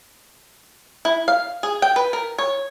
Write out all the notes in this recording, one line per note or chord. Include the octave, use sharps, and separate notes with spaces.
E4
F5
G#4
G5
B4
A#4
C#5